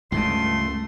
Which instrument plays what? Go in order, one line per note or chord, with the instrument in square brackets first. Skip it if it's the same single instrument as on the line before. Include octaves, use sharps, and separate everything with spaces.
[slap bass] C#2 G2 C#3 [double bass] A3 [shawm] C6